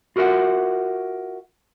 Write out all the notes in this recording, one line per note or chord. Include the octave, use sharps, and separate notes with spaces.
F4 F#4 A#4 E5 F#5